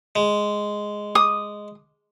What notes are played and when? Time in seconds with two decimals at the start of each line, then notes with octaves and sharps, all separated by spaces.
0.16 G#3
1.15 D#6